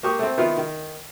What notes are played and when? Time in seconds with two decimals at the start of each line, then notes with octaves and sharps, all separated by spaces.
0.03 A#3 G4 C#6 D#6
0.19 A3 C4
0.38 D#3 B3 E4 F4
0.57 D#3